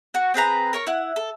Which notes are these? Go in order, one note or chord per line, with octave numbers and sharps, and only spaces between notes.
F#4 F#5
C4 G#4 B4 A#5
A#4 C#5 C#6
E4 F#5
A4